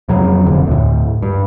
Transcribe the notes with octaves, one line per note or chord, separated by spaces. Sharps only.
F2 C#3 F#3
E1 F2 D3
D2 A2
G2